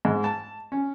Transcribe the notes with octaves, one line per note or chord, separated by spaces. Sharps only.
G#2
A5
C#4